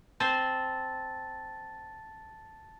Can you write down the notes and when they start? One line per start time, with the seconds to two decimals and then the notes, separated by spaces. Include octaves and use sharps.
0.20 C4 C5 A5 A6